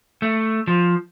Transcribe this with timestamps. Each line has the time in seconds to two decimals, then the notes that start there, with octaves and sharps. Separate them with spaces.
0.22 A3
0.67 F3